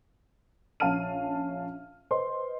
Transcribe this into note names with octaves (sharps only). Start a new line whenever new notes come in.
A#1 C#4 F5 A5 F6 D#7
B4 C5 D#5 C6